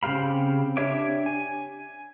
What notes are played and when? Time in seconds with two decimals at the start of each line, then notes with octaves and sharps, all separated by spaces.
0.03 C#3 C4 G4 F5 B5
0.77 D4 G4 C#5 E5 D6
1.26 G#5